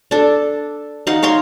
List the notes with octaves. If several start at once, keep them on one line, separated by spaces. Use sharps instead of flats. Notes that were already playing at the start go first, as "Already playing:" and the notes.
D4 A4
D#4 F5 F#5
C#5 F5 A#5 C6